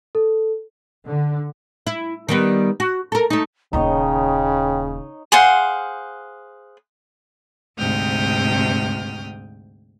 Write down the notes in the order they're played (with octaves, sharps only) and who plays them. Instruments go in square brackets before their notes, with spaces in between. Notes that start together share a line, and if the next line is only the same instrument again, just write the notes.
[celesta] A4
[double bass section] D3
[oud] E4
D#3 G3 B3
F#4
A4 A#4
A3 D#4
[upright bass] D#1 D#2 [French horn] C#3 [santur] D#4 C#5 D#5 [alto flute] G5
[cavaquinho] G#4 C5 F5 F#5
[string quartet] D2 G#2 C3 G5 D#6 F6